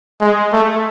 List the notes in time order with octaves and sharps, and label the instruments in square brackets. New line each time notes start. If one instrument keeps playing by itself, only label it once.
[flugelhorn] G#3
A3